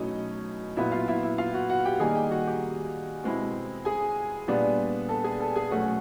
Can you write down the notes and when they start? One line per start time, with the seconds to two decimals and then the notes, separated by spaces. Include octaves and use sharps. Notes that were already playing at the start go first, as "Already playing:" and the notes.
Already playing: B2 F#3 A3 C#4 D#4 E4 D#5
0.77 A#2 F#3 B3 E4 E5
0.92 F4 F5
1.08 E4 E5
1.23 E4 E5
1.38 F4 F5
1.54 F#4 F#5
1.69 F#4 F#5
1.85 G4 G5
2.00 D#3 G3 A#3 D#4 G#4 G#5
2.15 G4 G5
2.31 F#4 F#5
2.47 G4 G5
3.24 B2 G#3 C4 E4
3.85 G#4 G#5
4.48 A#2 G3 B3 D4
5.09 A4 A5
5.24 G#4 G#5
5.40 A4 A5
5.56 G#4 G#5
5.71 B2 F#3 A3 C#4 F#4 F#5